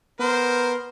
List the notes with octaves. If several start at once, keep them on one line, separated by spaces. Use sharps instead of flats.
B3 A#4 C5